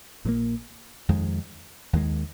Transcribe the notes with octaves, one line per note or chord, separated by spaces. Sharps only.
A#1 A#2 F3 A#3
F2 D#3 G#3
D#2 D#3 G#3